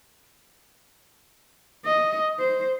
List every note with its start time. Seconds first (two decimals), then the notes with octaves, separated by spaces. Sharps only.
1.85 D#5
2.39 C5